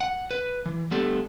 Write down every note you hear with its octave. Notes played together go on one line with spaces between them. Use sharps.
F#5
B4
E3
G3 A3 B3 D4 G4 A4